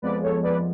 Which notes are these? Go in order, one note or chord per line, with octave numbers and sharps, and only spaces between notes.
F2 F3 G#3 B3 B4 D5
A4 C#5
B4 D5